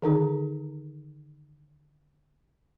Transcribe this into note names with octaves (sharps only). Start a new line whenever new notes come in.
D3 D#3 D#4 G#4